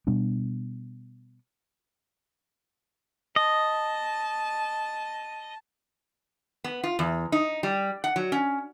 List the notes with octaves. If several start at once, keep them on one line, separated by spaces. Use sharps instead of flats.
B2 G3 B3 D4
D#5 A5
B3
F4
E2
D#4
G3
F#5
F#3
C#4